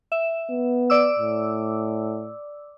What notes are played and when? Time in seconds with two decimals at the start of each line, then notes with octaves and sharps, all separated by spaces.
0.12 E5
0.50 B3
0.90 D5 D6 E6
1.19 A2